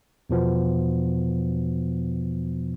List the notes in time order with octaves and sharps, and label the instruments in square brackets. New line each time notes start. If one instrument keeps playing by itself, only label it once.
[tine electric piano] E2 B2 F3 B3